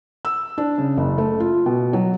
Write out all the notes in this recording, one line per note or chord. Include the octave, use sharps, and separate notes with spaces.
E6
D4
C#3
F#1
A3
F4
B2
F#3